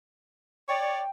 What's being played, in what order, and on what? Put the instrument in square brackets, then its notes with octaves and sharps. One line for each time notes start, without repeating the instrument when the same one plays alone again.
[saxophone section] C#5 D5 [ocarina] G5